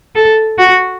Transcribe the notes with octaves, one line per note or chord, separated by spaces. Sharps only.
A4
F#4